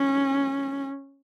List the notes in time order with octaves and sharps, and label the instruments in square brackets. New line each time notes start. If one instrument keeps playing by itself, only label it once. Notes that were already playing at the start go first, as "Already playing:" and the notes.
Already playing: [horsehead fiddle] C#4